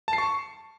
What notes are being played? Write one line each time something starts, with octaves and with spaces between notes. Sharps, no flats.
A5
C7
C#6